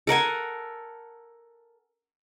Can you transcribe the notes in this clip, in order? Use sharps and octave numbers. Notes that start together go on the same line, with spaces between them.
A4 A#4 F#5 G#5